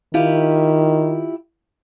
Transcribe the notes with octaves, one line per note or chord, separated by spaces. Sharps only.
D#3 E4 F4 G4